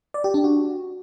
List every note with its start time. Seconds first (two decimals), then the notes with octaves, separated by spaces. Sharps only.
0.14 D5
0.24 G4
0.34 D4
0.44 F#4